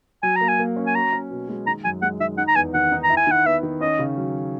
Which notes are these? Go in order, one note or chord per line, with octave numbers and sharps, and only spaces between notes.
F#3 G#5
A#3 A#5
G#5
A#3
C#4
G#5
F#4 A#5
C#4
B2
G#3
D#3 A#5
F#2 G#5
G#3 F#5
D#3 E5
D#4 F#5
A#5
E2 G#5
D#3 F#5
D#4
A#5
E4
G#5
D#3 F#5
B3 E5
D#3
C#4 D#5
C#3
F#3